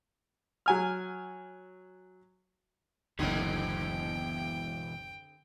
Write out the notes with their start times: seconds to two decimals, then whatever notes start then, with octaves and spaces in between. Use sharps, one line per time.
0.66 F#3 G#5 F6
3.19 F#1 D2 B2 D3 E3 C4 G#4 G5